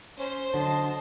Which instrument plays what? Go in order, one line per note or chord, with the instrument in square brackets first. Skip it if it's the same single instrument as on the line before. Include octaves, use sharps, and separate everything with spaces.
[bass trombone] C#4 [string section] C5
[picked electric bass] D3 [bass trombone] F#3 [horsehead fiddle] D#5 A5